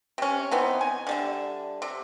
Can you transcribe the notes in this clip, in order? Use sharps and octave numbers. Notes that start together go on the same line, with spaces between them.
C3 C#4
E3 B3 C4 D#4
G#5
D3 G3 E5
C3